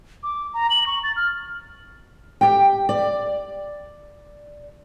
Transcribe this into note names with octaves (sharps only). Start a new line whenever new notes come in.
D6
A#5
F#7
C#6
A6
F6
G4 G5
D5